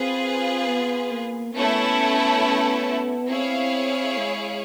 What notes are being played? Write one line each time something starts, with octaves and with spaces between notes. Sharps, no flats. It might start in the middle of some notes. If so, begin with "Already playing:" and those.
Already playing: C4 F4 G#4 B4
B3
A#3
A3 B3 C#4 E4 A4
C4 E4 G#4 C#5 F5
G#3